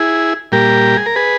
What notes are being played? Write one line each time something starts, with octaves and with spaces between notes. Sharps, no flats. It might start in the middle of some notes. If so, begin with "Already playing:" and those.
Already playing: E4 G#4
A#2 G3 G4 A#4
G#4
A#4
G#4 B4